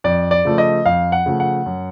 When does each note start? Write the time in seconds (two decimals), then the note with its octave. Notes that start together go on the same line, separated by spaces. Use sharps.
0.04 F2 D5
0.31 D5
0.45 C#3 F3 A3
0.58 D#5
0.86 F2 F5
1.12 F#5
1.26 C#3 F3 A3
1.40 F#5
1.66 F#2